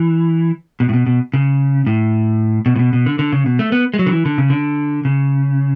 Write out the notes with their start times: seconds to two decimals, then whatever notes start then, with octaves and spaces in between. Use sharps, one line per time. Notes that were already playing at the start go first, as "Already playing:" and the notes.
Already playing: E3
0.80 B2
0.89 A2
0.93 B2
1.06 B2
1.34 C#3
1.87 A2
2.66 B2
2.76 A2
2.79 B2
2.93 B2
3.06 D3
3.19 D3
3.33 C#3
3.46 B2
3.59 A3
3.72 B3
3.94 G#3
3.99 F#3
4.06 D3
4.12 E3
4.26 D3
4.38 C#3
4.50 D3
5.05 C#3